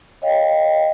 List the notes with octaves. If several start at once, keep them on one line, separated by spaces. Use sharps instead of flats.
C#5 D#5 F5 G5